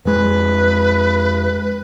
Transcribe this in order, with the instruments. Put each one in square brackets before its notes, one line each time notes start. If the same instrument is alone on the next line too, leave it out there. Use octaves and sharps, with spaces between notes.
[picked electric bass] F2 G#3 [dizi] B4